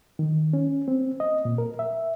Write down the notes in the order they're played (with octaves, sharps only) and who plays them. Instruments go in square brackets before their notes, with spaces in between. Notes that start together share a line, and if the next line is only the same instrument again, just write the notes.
[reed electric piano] D#3
C#4
C4
D#5
A#2
A#4
E5